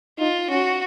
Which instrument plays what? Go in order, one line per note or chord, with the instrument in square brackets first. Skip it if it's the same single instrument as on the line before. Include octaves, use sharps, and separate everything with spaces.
[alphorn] D#4 [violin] F4
[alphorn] C#4 [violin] F#4